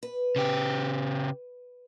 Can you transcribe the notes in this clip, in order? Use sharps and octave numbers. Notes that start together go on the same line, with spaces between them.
B4
C#3 G4